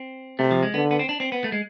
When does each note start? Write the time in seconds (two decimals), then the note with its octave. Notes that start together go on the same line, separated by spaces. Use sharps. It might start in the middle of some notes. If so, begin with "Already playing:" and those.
Already playing: C4
0.39 C3 A3
0.51 F3
0.63 G#3
0.74 D3 B3
0.91 B3
0.99 C4
1.09 D4
1.20 C4
1.32 B3
1.44 A3
1.52 G#3